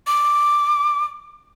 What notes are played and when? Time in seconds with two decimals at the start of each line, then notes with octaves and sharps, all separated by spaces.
0.07 D6